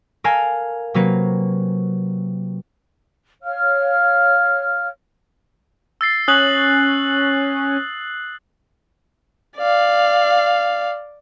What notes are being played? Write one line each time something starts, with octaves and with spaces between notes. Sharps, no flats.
A4 A#4 F5 G#5
C3 F#3 A#3 B4
C#5 F5 F6
E6 A6 C7
C#4 D#6 F#6 F#7
D5 F5